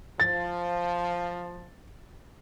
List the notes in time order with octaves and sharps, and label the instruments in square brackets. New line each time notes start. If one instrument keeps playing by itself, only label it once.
[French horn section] F3 [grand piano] A6